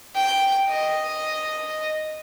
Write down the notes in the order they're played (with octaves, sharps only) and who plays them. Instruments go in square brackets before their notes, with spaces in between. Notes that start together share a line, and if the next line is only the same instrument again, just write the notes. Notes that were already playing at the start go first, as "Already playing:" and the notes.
[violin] G5
D#5